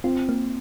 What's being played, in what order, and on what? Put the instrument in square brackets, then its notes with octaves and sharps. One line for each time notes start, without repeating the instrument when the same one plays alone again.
[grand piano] C4 [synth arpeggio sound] F4
[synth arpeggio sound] A#3